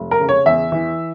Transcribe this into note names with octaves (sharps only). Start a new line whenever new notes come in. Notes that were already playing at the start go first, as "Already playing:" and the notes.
Already playing: F1
A#4
C#3
C#5
E2 E5
E3